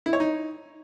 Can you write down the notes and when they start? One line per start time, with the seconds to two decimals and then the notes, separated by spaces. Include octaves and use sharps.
0.06 E4
0.13 C#5
0.20 D#4